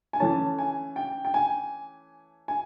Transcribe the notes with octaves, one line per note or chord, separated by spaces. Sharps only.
G#5
E3 A3 C#4 A5
G#5
G5
G5
G#5
G#5